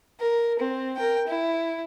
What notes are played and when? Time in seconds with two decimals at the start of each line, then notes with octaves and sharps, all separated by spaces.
0.20 A#4
0.59 C4
0.96 A#4 G5
1.27 E4